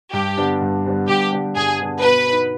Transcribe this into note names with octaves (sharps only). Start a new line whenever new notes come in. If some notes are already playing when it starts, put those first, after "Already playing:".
G2 G4
D3 G3 B3 D4
G2
D3 G3 B3 D4
G2 G4
D3 G3 B3 D4
G2 G#4
D3 G3 B3 D4
B2 B4
B3 D#4